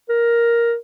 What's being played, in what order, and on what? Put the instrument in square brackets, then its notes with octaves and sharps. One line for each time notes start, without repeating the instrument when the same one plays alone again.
[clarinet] A#4